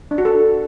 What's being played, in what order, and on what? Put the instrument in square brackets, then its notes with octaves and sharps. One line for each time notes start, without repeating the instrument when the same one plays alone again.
[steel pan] D4
F#4
A4